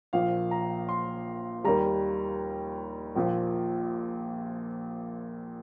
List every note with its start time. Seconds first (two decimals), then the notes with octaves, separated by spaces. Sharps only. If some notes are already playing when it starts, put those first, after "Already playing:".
0.13 A#1 A#2 F3 F5
0.51 A#5
0.89 C6
1.64 D#2 D#3 G3 A#5
3.15 A#1 A#2 F3